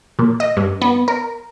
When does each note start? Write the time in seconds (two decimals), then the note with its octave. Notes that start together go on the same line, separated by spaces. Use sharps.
0.19 A#2
0.40 D#5
0.57 G2
0.81 B3
1.08 A#4